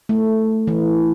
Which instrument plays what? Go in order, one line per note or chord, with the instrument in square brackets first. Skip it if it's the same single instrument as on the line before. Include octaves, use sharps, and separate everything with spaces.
[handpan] A3
E3